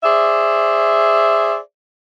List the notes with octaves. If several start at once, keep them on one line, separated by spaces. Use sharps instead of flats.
G#4 C5 D5 E5